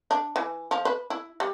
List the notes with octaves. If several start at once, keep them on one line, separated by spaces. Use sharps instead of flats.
D4
E3
F3
B4
E4
G3